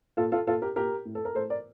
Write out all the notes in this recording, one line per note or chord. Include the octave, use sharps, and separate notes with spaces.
A#2 F4 A4
F4 A4
A#2 F4 A4
G4 A#4
A#2 G4 A#4
A2
A4
A#4
A2 A4 C5
A#4 D5